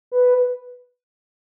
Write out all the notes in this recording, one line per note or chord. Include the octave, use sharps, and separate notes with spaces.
B4